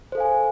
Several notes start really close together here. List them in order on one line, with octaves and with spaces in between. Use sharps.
C5 A4 F5 G#5